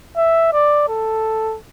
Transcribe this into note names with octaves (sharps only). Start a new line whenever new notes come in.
E5
D5
A4